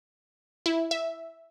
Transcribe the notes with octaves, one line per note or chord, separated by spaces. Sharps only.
E4
E5